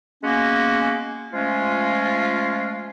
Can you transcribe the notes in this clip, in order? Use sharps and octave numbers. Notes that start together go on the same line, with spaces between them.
G#3 A#3 B3 C#4 F#4
F3 G#3 A3 C#4 F4